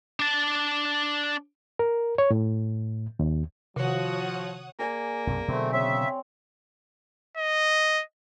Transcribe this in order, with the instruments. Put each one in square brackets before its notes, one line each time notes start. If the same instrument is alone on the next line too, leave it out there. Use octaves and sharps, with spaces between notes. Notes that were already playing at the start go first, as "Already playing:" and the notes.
[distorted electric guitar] D4 A5
[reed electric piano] A#4
C#5
A2
D#2
[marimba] C3 D#3 [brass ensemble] F3 [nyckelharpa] F#4 [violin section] C#5 F#5 D#6
[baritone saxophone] A#3 [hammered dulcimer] G#4 D5 G#5
[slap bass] B1 F#2 C3
[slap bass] B2 D3 F#3 [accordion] A3 C4
[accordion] C#3 E5 [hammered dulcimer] C4 C#5
[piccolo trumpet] D#5